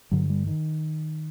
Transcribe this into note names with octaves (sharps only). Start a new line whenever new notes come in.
G2 D3 F#3
G3
D#3